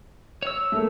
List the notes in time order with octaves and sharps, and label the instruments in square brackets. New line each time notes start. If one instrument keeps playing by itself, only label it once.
[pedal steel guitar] C#5 E6
[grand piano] A3 A#3